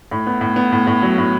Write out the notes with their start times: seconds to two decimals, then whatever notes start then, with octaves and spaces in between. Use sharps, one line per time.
0.11 A2
0.27 B3
0.41 A2
0.56 B3
0.72 A2
0.87 A2
1.02 F#3
1.18 A2